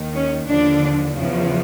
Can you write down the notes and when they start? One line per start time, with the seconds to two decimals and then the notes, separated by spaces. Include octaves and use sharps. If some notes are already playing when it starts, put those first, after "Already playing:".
Already playing: D#2 D#3
0.16 C#4
0.48 D#2 D3 F3 D4
1.14 E2 C#3 F3